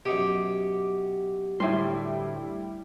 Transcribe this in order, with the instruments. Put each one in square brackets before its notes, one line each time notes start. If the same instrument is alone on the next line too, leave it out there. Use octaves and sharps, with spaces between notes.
[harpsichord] F#2 B2 D#6 [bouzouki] G4
[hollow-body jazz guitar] D2 A2 C6 [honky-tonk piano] G3 E4